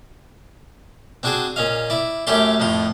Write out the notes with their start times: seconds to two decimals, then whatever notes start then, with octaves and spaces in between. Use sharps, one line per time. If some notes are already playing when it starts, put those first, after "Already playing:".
1.23 C4 D4 F#4 G#4 C5
1.56 A#2 C#4 D#5 F5
1.90 E4 D5
2.27 F#2 A3 C#4 G4 D5 C6
2.60 F2 A2 F3 C6